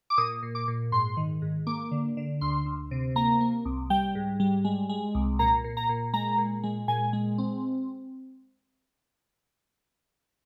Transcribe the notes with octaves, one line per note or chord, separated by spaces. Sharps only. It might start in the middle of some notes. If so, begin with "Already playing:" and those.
D6
A#2 D#6
A#2
D6
A#2
G#2 C6
D#3
G#2
A#3 D6
D3
D3
D2 C6
D2
C3
A#3 A#5
A#3
C2
G3 G5
G#2
G3
G#3
G#3
C2
A#2 A#5
A#2
A#5
A#2
G#3 A#5
A#2
G#3
A#2 G#5
G#3
C4